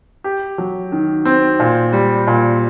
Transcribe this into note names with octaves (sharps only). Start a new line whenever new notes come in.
G4
F#3
D#3
C4
A#2
G3
A#2